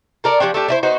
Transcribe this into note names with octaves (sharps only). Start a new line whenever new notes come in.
A4 A#4 D5
F3 G3 C#4 D4
A3 D4 G4
D4 E4 C5
B3 D#4 F#4 C5